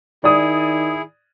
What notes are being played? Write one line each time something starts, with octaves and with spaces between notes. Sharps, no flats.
D#3 E4 G#4 D5 D#6